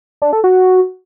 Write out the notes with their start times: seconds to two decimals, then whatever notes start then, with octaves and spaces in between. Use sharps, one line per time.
0.22 D4
0.33 A4
0.44 F#4